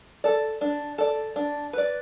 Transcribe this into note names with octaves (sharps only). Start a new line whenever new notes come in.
A4 D5
D4
A4 D5
D4
B4 D5